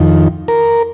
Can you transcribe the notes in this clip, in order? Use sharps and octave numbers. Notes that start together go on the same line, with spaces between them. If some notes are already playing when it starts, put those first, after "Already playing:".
Already playing: F2 D#3
A#4